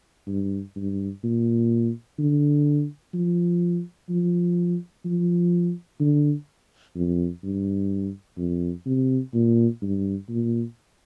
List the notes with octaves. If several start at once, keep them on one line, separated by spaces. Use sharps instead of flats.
G2
G2
A#2
D3
F3
F3
F3
D3
F2
G2
F2
C3
A#2
G2
A#2